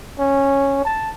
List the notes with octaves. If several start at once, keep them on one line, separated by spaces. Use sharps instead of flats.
C#4
A5